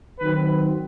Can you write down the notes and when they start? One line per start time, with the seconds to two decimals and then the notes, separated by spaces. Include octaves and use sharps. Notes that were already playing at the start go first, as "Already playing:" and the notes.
0.20 D#3 F#3 C4 B4